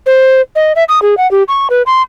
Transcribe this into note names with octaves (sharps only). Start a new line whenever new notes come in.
C5
D#5
E5
D#6
G#4
F#5
G4
C#6
B4
C6